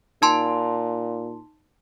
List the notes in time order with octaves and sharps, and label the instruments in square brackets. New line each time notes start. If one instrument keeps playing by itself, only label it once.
[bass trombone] A#2 [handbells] D#4 A5 C6